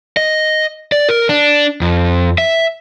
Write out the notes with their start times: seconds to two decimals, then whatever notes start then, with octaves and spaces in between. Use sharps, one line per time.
0.17 D#5
0.92 D5
1.09 A#4
1.29 D4
1.81 F2
2.38 E5